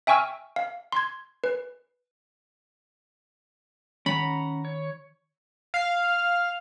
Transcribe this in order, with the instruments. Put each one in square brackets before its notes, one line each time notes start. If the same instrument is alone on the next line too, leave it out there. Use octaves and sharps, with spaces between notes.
[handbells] E5 G5 G#5 C#6 E6 F6
F5
C6 G#6
B4
[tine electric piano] D#3 [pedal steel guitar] C#4 F#5 A#5 [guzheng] B5
[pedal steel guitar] C#5
[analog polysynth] F5